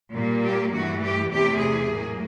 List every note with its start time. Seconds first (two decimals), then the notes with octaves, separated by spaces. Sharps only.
0.15 A#2 G3 A#3
0.45 G4
0.73 G2 E3 A3 F#4
1.03 G4
1.32 E2 C3 E3 A3 G4
1.61 G#4
1.91 A2 F#3 A#3